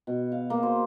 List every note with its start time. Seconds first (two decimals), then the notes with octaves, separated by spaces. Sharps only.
0.07 B2
0.32 F5
0.50 A#3
0.63 C5